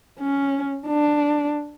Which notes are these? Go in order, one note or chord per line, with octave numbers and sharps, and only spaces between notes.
C#4
D4